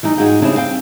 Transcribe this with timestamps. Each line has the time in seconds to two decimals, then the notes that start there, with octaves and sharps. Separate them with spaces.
0.03 E3 G3 D#4
0.18 G#2 G#3 F4 F#4 G5
0.42 C#3 G3 C4 D4 E4 C5
0.56 C4 F5 G5